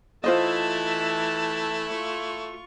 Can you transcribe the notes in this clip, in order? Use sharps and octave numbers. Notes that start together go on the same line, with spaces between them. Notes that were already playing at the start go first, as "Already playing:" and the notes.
E3 A3 E4 F4 C5 D#5 A5
F4 C#6